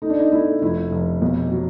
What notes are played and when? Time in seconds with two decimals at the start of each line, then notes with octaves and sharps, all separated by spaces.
0.02 A3 D#4
0.10 D4
0.19 D#4
0.32 A3 E4
0.62 F1 E4
0.92 F1
1.22 B1
1.51 F#3